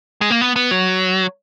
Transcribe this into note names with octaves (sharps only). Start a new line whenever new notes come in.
G#3
A#3
B3
B3
F#3